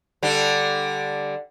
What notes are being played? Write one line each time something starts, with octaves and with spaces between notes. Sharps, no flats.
D3 G3 D4